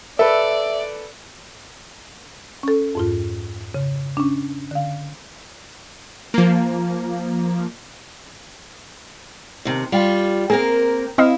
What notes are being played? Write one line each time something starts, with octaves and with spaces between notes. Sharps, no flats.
A4 B4 D5 E5
C#4 A4
F2 G#2 F4
C#3
C#4 D4
D3 F5
F3 A#3
D#2 C3
G3 F4 G4
A#3 C4 G#4 A#4
C4 E4 D#5 F5